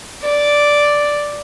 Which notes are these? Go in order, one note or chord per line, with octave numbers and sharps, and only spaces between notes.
D5